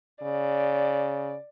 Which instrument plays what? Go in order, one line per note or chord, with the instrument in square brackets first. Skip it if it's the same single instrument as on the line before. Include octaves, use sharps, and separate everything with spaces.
[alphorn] C#3 [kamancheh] D5